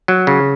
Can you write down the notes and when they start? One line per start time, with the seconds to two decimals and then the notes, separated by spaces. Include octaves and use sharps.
0.08 F#3
0.27 C#3